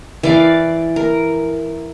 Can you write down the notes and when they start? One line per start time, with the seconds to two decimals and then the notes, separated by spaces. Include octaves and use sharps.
0.23 E3 D5 F5
0.96 A#4